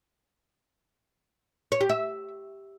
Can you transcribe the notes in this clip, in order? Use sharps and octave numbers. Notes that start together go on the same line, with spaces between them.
C#5
G4
E5